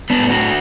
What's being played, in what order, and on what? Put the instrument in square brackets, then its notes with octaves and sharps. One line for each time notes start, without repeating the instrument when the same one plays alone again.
[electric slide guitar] B3 D4
A2
D4 F#4